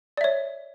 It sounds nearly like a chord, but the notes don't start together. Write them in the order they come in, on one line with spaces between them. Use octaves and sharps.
D5 E5 C#5